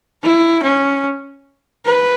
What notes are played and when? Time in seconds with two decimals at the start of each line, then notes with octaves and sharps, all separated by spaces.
0.23 E4
0.63 C#4
1.85 B4